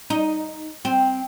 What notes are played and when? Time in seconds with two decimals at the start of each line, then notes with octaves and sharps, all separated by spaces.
0.10 D#4
0.85 C4